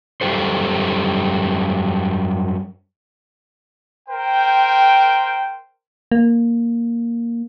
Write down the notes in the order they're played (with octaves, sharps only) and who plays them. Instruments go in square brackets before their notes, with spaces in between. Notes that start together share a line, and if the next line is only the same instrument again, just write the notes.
[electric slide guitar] F#2 C#3 G3 G4 A4 C5
[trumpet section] A#4 C5 G5
[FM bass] A#3